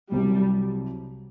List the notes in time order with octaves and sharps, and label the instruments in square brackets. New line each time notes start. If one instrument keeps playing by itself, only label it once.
[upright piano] C2 C3 F#3 [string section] G3